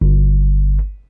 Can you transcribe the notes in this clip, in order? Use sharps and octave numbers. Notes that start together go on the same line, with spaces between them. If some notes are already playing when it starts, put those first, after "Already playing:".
G1